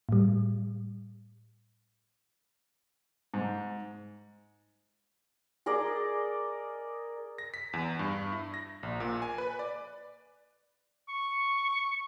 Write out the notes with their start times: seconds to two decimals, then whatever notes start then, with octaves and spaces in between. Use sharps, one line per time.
0.09 A2 G3
3.34 G#2
5.66 G#4 A#4 D5 D#5
7.38 A#6
7.54 B6
7.73 E2
7.99 G2
8.32 E4
8.54 A#6
8.83 A#1
9.00 A#2
9.22 G#5
9.38 B4
9.59 D5
11.08 C#6